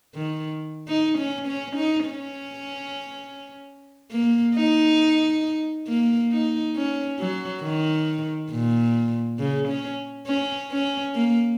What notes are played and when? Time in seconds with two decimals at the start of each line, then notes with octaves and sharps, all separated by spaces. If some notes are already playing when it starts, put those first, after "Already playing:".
0.15 D#3
0.88 D#4
1.18 C#4
1.47 C#4
1.76 D#4
2.06 C#4
4.11 A#3
4.56 D#4
5.88 A#3
6.32 D#4
6.76 C#4
7.19 F#3
7.63 D#3
8.51 A#2
9.39 C#3
9.69 C#4
10.27 C#4
10.71 C#4
11.15 A#3